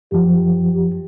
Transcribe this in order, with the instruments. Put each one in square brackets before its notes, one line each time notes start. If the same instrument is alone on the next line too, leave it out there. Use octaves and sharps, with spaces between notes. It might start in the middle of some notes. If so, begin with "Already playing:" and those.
[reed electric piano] F#2 F3 [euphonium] G4